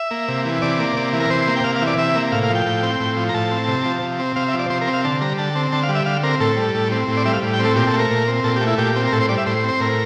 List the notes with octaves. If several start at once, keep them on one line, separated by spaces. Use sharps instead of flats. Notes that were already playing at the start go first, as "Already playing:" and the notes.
Already playing: E5
A#3
C3
E3
C3 D5
A#3
C3
E3
A#4
C3 C5
A#3
G5
C3 F5
F5
E3
D5
C3 E5
A#3
A2 F5
F5
F3
G5
A2
C4
A2
F3
A#5
A2 A5
C4
C3
F3
C3
C4
C3 F5
E5
F3
D5
C3 C5
A#4
C4
F5
D3 A5
G3 A#5
D3 A5
C4
D3 A5
F5
G3
E5
D3 F5
C4 A#4
A2 A4
G3
A2
C4
A2
D5
G3 E5
F5
A2
G5
C4
A4
A#2 G4
A4
A3
A#4
A#2
C4
A#2 A4
G4
A3
E4
A#2 G4
C4
A#4
A2 A4
C5
G3 D5
E5
A2 C5
C4 C5
A2 A#4